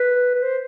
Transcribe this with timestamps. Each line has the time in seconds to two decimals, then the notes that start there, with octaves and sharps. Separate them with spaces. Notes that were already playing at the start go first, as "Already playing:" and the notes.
Already playing: B4
0.35 B4
0.43 C5